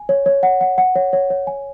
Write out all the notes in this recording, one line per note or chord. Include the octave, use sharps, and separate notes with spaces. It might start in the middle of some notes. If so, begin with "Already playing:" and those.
Already playing: G#5
C#5
C#5
F#5
F#5
F#5
C#5
C#5
C#5
G#5